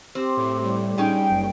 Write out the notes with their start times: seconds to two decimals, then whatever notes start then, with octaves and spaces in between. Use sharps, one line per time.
0.15 C4 G4 C5
0.37 A2
0.62 G3
0.98 C#4 D#4 G#4 G5
1.30 F#1